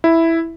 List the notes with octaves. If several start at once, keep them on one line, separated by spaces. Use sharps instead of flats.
E4